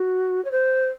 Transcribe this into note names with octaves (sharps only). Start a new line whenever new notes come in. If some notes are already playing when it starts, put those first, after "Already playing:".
Already playing: F#4
C#5
C5